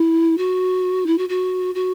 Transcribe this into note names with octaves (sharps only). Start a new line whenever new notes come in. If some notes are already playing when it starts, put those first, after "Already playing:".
Already playing: E4
F#4
E4
F#4
F#4
F#4